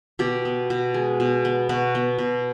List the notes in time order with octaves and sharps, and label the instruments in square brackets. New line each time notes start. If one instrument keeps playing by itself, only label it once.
[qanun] B2 G4
B3
B2
G#3
B2
B3
B2 F#4
B3
B2